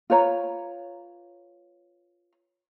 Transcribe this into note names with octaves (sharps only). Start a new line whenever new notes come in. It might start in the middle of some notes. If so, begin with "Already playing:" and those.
F4 B4 C#5 A#5